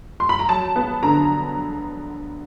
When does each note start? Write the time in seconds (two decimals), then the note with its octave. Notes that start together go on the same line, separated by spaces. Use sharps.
0.20 C6
0.29 B5
0.39 A#5
0.49 F#3 A5
0.76 B3
1.02 D3 A#5